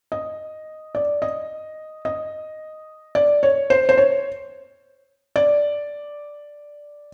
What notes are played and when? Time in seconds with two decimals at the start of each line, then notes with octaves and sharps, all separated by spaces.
0.12 D#5
0.95 D5
1.22 D#5
2.05 D#5
3.15 D5
3.43 C#5
3.70 C5
3.89 C5
3.98 C#5
5.36 D5